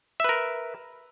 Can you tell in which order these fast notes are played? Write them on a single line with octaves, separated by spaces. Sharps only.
E5 B4 A#4